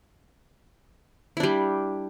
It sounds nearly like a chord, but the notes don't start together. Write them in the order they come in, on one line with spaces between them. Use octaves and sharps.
E4 D4 G3